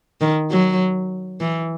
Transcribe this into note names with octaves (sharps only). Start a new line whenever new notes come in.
D#3
F#3
E3